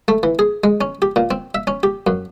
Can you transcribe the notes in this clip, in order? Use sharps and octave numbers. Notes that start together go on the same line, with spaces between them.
A3
E3
G#4
G#3
C#4
G4
A#2
C4
E5
C#4
G4
F#2